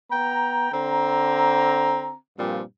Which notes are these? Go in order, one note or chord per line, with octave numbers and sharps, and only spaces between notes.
B3 G5 A#5
D3 C4 A#5
G2 A#2 F3 G3 C4